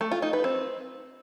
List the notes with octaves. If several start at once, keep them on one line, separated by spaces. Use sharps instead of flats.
A3
F4
D#4
B4
C4